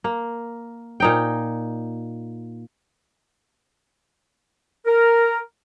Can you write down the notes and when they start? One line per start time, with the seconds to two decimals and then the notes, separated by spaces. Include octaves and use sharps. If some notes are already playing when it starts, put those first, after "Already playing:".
0.04 A#3
1.00 A#2 D#4 G5
4.86 A#4